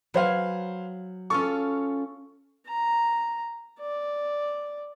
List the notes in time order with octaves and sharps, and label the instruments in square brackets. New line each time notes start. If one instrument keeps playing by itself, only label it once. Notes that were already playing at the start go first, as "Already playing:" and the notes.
[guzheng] F#3 G#5 [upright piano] B4 C5 F5
[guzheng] C#4 F4 A4 [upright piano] C#6
[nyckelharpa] A#5
D5